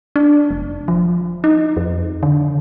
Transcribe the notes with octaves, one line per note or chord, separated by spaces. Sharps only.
D4
F1
F3
D#4
F2
D3